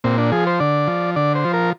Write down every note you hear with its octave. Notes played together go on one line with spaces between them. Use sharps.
A#2 C4
D4
F3 G#4
C5
D3 D5
F3
D3 D5
C5
F3
A#4